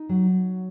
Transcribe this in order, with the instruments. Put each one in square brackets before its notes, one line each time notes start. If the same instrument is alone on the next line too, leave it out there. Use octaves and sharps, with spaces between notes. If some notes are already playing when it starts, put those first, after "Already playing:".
Already playing: [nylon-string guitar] D#4
F#3